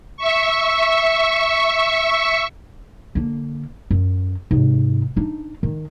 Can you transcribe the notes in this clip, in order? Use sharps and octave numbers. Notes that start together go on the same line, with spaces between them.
E5 C#6
D3 A#3
F#2
G#2 C3
D4 D#4
D#3